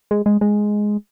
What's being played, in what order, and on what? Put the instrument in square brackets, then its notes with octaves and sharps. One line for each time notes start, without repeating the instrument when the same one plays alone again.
[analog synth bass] G#3
G#3
G#3